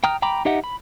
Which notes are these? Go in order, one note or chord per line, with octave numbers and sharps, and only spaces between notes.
G5 A#5 D#6 F6
G5 A#5 B5 D6
D#4 G4 D#5 E5 F#5
B5